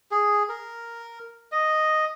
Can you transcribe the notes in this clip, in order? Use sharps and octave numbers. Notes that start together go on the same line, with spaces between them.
G#4
A#4
D#5